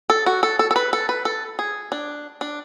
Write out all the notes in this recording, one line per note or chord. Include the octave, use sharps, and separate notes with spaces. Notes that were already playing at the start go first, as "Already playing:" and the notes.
A4
F#4
A4
A4
A4
B4
A4
B4
A4
G#4
D4
D4